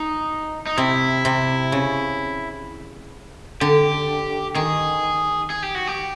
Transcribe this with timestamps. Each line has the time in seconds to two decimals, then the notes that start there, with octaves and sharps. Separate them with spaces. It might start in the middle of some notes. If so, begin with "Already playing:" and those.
Already playing: D#4
0.66 D#4
0.78 C3 E4
1.25 C3
1.72 C#3
3.61 D3 G4
4.55 D#3 G#4
5.50 G#4
5.62 G4
5.75 F#4
5.87 G4